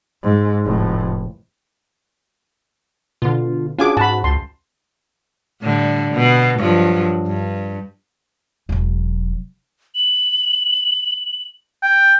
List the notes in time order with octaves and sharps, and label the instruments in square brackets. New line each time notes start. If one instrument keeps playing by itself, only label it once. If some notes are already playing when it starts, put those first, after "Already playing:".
[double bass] G#2
F1 A2
[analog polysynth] B2 D3 [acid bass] F4
[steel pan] C#4 F#4 G#4 [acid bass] D4 [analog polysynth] F4 G#5 D6
[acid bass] G#2 [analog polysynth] F#4 [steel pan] A5 B5
[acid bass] C#2 [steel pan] A5 C6
[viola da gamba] A2 D3 G3
B2
G2 F3 F#3
G2
[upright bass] E1 F#3
[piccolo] F#7
[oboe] G5